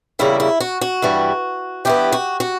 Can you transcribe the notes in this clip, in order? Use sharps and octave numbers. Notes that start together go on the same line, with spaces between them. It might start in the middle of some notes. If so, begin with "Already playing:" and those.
E2 C#3 G3 A#3 E4
E4
F#4
F#4
G2 E3 G3
G2 E3 B3 G4
F#4
F#4